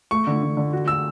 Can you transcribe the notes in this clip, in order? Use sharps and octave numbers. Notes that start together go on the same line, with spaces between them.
A3 C#6
D3
D3
D3
F#4
F#4 E6